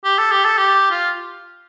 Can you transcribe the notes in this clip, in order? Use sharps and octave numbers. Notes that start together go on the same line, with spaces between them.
G4
A4
G4
A4
G4
F4